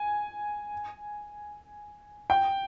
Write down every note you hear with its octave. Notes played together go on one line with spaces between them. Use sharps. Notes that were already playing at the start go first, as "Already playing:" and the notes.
Already playing: G#5
G5